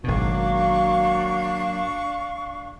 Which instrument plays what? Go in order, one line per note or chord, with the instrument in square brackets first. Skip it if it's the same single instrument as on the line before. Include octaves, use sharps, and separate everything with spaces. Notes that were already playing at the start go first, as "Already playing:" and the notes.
[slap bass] G#1 B2 [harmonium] F#3 A#3 F#4 [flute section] D4 F5 C#6